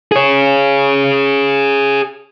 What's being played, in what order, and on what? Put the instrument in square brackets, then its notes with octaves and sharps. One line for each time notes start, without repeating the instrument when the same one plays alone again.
[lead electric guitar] G#4 C#5